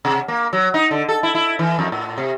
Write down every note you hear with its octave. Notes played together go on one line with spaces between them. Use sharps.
C3
A#3
F#3
D#4
D3
A4
E4
E4
E3
F2
A2
C3